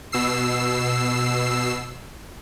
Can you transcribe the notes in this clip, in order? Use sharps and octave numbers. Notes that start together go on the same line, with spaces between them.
B2 E6 C7